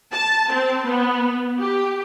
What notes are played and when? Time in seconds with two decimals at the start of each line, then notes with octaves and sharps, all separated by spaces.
0.12 A5
0.52 C4
0.87 B3
1.59 G4